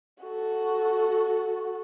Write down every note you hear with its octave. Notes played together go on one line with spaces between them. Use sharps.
F#4 A4